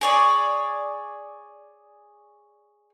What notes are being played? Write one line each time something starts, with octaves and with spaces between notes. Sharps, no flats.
G#4 C#5 D5